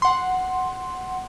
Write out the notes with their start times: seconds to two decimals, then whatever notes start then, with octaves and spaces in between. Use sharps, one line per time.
0.02 F#5 C6